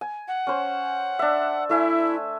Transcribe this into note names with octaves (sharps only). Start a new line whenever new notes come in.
G#5
F#5
C#4 C5
D4 E5
A3 E4 E5 G#5